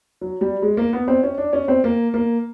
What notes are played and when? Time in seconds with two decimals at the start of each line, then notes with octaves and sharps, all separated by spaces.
0.21 F#3
0.41 G3
0.62 G#3
0.77 A#3
0.93 B3
1.08 C4
1.23 C#4
1.38 D4
1.53 C#4
1.68 C4
1.84 A#3
2.14 A#3